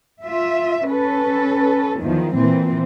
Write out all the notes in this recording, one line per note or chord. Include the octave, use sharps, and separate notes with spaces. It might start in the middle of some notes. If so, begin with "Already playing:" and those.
F4 E5
C#4 A4 B4
E2 D#3 F3
A#2 E3 C4